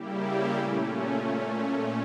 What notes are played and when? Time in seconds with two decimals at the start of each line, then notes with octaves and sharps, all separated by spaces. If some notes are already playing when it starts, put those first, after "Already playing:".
Already playing: C#3 G3 A#3 E4 G4
0.57 A#2 A3 C#4